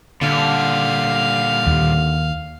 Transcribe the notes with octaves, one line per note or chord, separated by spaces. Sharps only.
A#2 D3 G3 F5
D#2